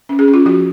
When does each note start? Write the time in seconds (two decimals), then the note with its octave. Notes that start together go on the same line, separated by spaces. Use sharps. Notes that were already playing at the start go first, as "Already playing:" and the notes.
0.09 C#4
0.19 G#4
0.28 C#4
0.34 F4
0.46 F3 F#4